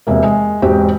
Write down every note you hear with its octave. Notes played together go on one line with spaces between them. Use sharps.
E1 C3 A#3
G#3
E1 G#2 C4 F#4 G4